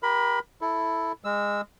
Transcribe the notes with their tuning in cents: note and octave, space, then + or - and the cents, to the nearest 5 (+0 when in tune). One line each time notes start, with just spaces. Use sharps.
G4 +0 A#4 +35 B5 +15
E4 +0 A4 +0
G#3 -20 E6 +0